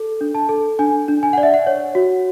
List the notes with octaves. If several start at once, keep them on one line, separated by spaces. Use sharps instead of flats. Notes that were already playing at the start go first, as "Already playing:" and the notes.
Already playing: A4
D4
A5
A4
D4 G#5
D4
G#5
D5 F#5
E5
F#5
C#5
F#4